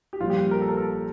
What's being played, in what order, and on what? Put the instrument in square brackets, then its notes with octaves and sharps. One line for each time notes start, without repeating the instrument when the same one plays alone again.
[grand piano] G4
[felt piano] A#1 A#2 G3 [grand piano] F4
[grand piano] G4
A#4
A4
A#4
A4